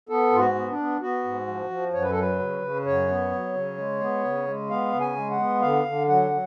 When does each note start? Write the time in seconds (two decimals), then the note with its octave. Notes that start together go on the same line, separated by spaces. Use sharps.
0.09 B3 A4
0.32 G#2 F4
0.40 F#4
0.55 B3
0.70 D4
0.79 B3
1.01 B3 F#4
1.24 G#2
1.47 F3
1.70 F3
1.93 F#2 C#5
2.02 B4
2.11 A4
2.17 F#3 B4
2.39 C#3
2.62 C#3
2.86 F#2 C#5
3.09 B3
3.32 F#3
3.54 C#3
3.78 G#3
4.01 B3
4.24 C#3
4.47 G#3
4.70 B3 F5
4.93 C#3
5.00 G#5
5.17 G#3
5.31 F#5
5.40 B3
5.62 D3 F5
5.85 D3
6.08 F#3 F#5
6.31 F#3